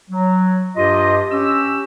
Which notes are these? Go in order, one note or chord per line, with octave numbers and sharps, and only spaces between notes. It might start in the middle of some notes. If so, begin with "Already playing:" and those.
F#3
G2 F4 G4 D#5
C#4 G4 E6